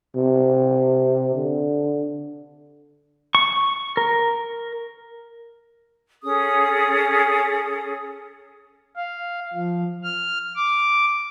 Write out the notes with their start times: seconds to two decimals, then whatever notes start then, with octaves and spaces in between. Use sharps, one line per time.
0.16 C3
1.35 D3
3.35 C#6
3.97 A#4
6.23 C#4 G#4 A4 D#6
8.96 F5
9.53 F3
10.03 F6
10.56 D6